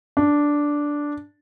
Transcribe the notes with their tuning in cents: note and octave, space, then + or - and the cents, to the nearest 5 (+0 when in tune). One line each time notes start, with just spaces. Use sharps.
D4 -5